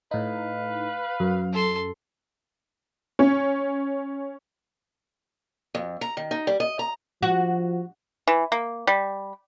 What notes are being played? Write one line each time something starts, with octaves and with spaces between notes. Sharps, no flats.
A2 D#4 B4 F5
F#2
A4 C6
C#4
F2
A#5
D#3
D#4
G3
D#5
A#5
F3 F#4
E3
A#3
G3